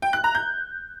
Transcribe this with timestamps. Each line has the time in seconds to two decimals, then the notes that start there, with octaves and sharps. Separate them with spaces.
0.02 G5
0.13 F#6
0.24 A#5
0.35 G6